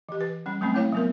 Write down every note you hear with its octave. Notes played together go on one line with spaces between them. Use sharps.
E3 G4
B4
G3 C#4
F#3 A3 A#3 C4 C#4
A3 E4 C#5 F5 F#5
F#3 B3 A#4